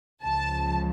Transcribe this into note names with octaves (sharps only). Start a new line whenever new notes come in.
C#2 C#3 F3 A5